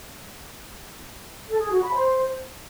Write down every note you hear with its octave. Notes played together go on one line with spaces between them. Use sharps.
A4
G#4
F#4
B5
C5